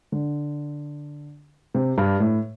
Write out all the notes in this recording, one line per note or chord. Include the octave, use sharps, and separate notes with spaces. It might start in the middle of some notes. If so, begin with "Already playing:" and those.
D3
C3
G2
A2